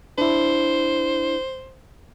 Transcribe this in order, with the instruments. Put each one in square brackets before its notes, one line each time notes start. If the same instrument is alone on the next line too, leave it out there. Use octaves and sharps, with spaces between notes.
[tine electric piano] D4 E4 [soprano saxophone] C5